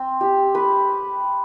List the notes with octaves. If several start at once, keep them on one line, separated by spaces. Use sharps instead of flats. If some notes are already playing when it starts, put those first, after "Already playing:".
Already playing: C4
G4
B4